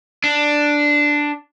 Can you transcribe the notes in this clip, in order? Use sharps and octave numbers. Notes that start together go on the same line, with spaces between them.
D4